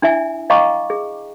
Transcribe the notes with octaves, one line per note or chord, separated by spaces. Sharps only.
D4 E4 E5 G#5
D#5 F5 G5 A#5 C#6 D6
G#4